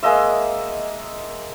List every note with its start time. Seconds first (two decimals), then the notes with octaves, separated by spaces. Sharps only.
0.03 G#3 A#3 D#5 E5